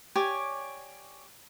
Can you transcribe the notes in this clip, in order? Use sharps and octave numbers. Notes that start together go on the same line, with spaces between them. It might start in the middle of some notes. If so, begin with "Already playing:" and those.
G4 C#5 D5 G#5